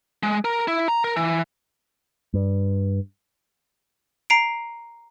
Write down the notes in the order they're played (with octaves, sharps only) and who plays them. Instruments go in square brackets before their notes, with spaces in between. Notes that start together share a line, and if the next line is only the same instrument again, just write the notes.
[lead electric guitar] G#3
A#4
E4
A#5
A#4
E3
[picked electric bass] G2
[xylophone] A#5 C7 D7